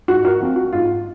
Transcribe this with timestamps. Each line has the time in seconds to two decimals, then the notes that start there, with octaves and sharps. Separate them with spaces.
0.08 G#2 F#4
0.25 F#4 A#4
0.40 F3 C4
0.56 F#4
0.73 G#2 F4